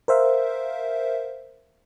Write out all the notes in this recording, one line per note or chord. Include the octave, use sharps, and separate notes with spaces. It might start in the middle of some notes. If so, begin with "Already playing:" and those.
A#4 C5 E5 F5